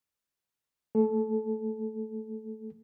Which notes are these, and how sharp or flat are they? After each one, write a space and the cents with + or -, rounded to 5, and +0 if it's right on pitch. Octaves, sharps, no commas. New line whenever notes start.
A3 +10 A4 -20